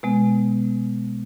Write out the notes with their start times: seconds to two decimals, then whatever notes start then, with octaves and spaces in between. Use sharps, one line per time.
0.03 B2 G#3 B3